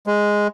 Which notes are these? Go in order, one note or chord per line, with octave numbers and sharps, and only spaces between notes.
G#3